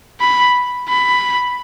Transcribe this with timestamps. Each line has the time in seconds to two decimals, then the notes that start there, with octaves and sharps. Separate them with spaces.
0.21 B5
0.89 B5